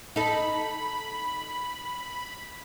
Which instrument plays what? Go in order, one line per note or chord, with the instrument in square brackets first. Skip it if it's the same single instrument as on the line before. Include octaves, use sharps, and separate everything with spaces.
[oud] D#4 A4 [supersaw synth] B5